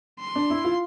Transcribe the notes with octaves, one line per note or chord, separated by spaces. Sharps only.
C6
D4
E4
F4